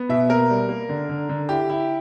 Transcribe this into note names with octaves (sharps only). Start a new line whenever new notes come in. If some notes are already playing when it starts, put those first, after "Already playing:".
Already playing: B3
B2 E5
A#3 A#4
G3
A#3
D3
D3
D3
E4 G4
E4